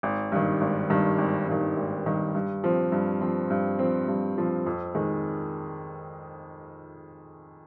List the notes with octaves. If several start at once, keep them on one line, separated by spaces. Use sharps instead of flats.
G#1
G2 D#3
G#1
G2 D#3
G#1
G2 D#3
G#1
G2 D#3
G2
F3 C4
G2
F3 C4
G2
F3 C4
G2
F3 C4
F2
D#3 G#3